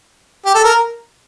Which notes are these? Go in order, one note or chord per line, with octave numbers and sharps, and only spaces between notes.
G4
A4
A#4